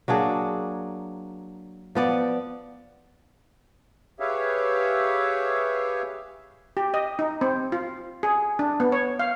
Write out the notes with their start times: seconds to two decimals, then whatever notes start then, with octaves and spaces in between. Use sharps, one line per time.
0.08 F#3 A#3 D4 G#4
1.95 F3 B3 D5
4.20 G4 G#4 B4 C#5 E5 F5
6.77 G4
6.94 D#5
7.19 D#4
7.41 C4
7.72 F4
8.23 G#4
8.59 D4
8.80 B3
8.92 C#5
9.19 F5